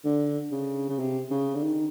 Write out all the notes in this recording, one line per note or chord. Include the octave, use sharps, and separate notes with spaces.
D3
C#3
C#3
C3
C#3
D3
D#3